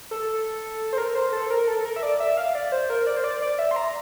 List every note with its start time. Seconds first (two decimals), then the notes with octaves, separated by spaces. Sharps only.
0.11 A4
0.93 C5
0.98 A#4
1.15 C5
1.33 A4
1.50 A#4
1.67 A4
1.85 A#4
1.96 E5
2.03 D5
2.20 E5
2.37 F5
2.55 D5
2.72 C5
2.90 A#4
3.07 D5
3.16 C5
3.24 D5
3.42 D5
3.59 E5
3.71 C6
3.76 A#5